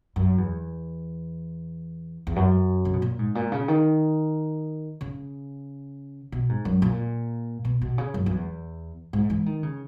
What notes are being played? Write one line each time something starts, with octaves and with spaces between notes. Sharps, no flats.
F#2
E2
E2
F#2
C#3
B2
A#2
G#2
A#2
C#3
D#3
C#3
B2
G#2
F#2
A#2
B2
B2
C#3
F#2
F#2
E2
G#2
E3
D#3
C#3